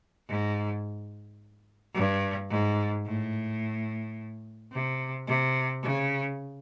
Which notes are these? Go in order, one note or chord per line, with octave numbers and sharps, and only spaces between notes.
G#2
G2
G#2
A2
C3
C3
C#3